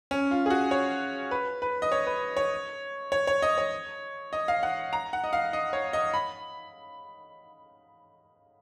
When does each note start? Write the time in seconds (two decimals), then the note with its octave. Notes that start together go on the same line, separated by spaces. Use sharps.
0.11 C#4
0.31 F4
0.46 G#4
0.50 F#4
0.71 C#5
1.31 B4
1.62 B4
1.82 D#5
1.92 C#5
2.07 B4
2.37 C#5
3.12 C#5
3.27 C#5
3.42 D#5
3.58 C#5
4.33 D#5
4.48 F5
4.63 F#5
4.93 A#5
5.13 F#5
5.24 D#5
5.33 F5
5.53 D#5
5.73 C#5
5.93 D#5
6.14 B5